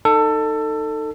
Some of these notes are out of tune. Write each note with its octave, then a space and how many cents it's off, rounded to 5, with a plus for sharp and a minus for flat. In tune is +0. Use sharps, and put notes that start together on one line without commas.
D#4 -15 A4 +20